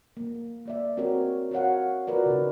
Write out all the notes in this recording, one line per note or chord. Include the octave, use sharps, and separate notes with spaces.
A#3
A#3 D5 E5
C4 F#4 G#4 A#4 C#5
F#4 A#4 C#5 F5 F#5
F4 F#4 A#4 B4 D5
C#3 D#4